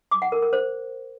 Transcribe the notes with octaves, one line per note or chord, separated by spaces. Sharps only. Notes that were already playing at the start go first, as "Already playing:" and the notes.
D6
F#5
A#4
A#4
C5